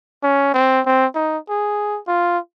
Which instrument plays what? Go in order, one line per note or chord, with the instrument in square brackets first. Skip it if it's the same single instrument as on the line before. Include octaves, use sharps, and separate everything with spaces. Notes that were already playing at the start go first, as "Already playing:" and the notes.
[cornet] C#4
C4
C4
D#4
G#4
F4